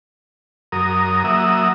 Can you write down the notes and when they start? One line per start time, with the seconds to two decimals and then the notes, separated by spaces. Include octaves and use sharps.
0.72 F#2 A#4 D#6
1.24 F#3 A#3 E5 D#6